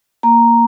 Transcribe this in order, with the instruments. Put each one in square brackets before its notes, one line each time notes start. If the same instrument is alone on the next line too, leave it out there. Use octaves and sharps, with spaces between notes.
[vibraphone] A#3 A#5